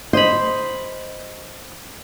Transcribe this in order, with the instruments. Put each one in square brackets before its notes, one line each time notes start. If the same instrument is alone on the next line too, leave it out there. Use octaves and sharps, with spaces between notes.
[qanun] C5 B5 [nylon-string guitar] D#5